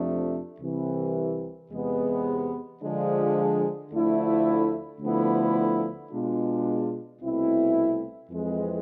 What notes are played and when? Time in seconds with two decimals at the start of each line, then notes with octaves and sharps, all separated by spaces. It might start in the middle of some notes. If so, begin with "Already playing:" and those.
Already playing: F2 C3 F3 A3 D4
0.61 C2 C3 E3
1.71 E2 C3 G#3 B3
2.81 D3 F3 G#3 D4
3.91 D2 D3 F3 A3 E4
5.01 D2 D3 F3 B3 E4
6.11 B2 G#3 D4 F4
7.21 C2 B2 A3 C4 E4
8.30 F2 E3 G#3 C4